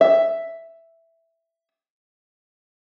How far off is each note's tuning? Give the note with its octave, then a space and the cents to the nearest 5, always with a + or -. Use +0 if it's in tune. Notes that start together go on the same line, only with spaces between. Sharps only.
E5 +0